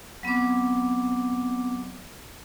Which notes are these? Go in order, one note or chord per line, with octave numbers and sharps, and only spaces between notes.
F#3 B3 C4 D6